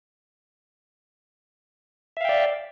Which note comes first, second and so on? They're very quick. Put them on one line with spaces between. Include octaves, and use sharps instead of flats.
E5 F5 G5 D5